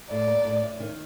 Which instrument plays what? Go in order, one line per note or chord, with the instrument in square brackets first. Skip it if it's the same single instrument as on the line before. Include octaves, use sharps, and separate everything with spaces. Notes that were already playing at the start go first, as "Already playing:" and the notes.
[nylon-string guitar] A2 [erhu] D5
[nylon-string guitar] A#3
A2
A2
D#3